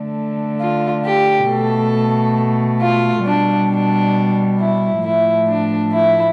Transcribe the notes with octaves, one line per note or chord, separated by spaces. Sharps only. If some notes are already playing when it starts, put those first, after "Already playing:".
Already playing: D3 A3
F4
G4
B2 A3 A4
F4
B2 G3 D4
D4
E4
A2 F3 A3 E4
D4
E4